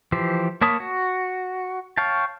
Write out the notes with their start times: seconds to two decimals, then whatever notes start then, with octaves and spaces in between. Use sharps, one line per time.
0.12 E3 F3 G4 C5
0.61 A#3 C#5 A5 B5 D#6
0.80 F#4
1.97 C#5 F5 G5 A5